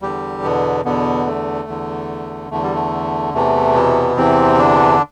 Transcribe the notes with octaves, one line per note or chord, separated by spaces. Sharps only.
E2 D3 G3 G4
B2 B3
E2 B2 D3 B3
A3
E2 D3
E2 D3 A3
G3
A3
E2 C3 E3 A3
B2 B3
E2 C3 E3 C4
D3 D4